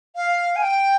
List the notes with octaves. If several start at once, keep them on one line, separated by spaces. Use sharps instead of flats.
F5
G#5
G5